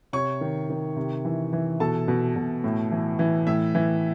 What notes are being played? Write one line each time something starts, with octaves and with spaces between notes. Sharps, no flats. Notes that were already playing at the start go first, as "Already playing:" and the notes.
C3 C#5 C#6
D#3
D#3
C3
E3
E3
B2 A4 A5
B2
B2
A2
E3
E3
A2 E5
E3